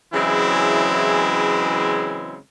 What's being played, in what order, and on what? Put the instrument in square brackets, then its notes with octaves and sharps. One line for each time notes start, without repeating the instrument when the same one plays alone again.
[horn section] C#3 E3 F#3 G#3 C4 E4